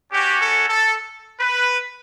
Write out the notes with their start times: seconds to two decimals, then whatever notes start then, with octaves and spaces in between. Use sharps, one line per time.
0.12 C#4 F#4 G4
0.40 A4
0.68 A4
1.40 B4